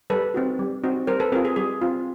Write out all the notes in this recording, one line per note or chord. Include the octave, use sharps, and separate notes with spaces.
G3 A4 B4
C4 D#4 F#4
G3
C4 D#4 F#4
G3 A#4 C5
A4 B4
C4 F4 G#4 A#4
G#4
G3 G#4
C4 F4